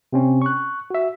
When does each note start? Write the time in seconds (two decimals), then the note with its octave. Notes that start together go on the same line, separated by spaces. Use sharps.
0.13 C3 C4 C#4
0.42 C#6 F#6
0.90 F#4 E5